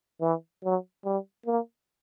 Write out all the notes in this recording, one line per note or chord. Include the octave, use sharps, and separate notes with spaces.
E3
F#3
G3
A#3